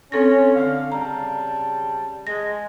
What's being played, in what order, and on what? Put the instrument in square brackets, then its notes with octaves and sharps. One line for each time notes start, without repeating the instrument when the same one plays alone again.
[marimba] C4 A4 A#6 [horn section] C#4
[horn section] D3 F5
[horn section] C#3 G3 A5 [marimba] A#5
[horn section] G#3 [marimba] A#6